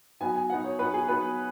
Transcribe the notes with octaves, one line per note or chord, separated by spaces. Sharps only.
F#3 B3 D#4 G#5
G#5
F#3 B3 D#4 F#5
C#5
F#3 B3 D#4 B4
G#4
F#3 B3 D#4 B4